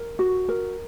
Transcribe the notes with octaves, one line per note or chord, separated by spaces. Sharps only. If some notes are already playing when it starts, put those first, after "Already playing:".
Already playing: A#4
F#4
A#4